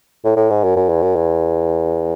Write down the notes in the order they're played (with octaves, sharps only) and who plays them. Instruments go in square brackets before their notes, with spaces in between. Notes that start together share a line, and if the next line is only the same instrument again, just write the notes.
[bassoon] A2
A2
G#2
F#2
F#2
E2
F#2
E2